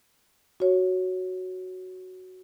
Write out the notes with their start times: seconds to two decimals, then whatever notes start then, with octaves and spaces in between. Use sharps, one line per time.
0.60 F#4 C#5